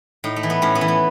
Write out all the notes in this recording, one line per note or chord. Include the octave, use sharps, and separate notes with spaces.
A2 D#4
A3
E3
B3
A2 C#4
B3
E3
B3